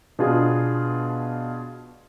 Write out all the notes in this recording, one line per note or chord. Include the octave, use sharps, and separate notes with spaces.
B2 B3 D4 F4 G#4